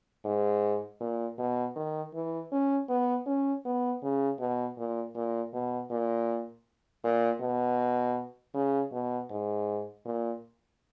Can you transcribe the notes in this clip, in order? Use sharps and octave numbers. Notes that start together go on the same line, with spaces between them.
G#2
A#2
B2
D#3
E3
C#4
B3
C#4
B3
C#3
B2
A#2
A#2
B2
A#2
A#2
B2
C#3
B2
G#2
A#2